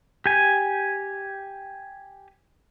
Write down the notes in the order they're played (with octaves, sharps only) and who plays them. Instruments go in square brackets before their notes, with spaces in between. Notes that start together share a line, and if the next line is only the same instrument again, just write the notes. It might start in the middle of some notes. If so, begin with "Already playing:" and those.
[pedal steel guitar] G4 G#5